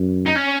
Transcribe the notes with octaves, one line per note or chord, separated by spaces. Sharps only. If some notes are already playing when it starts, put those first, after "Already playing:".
Already playing: F#2
D#4
C#4